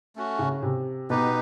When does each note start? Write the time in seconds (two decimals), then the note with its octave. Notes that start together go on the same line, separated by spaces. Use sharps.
0.16 A3 C#4 F#4
0.39 C#3
0.62 C3
1.10 B2 D#4 G4 B4